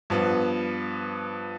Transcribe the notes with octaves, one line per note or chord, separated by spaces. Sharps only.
G2 F3 B3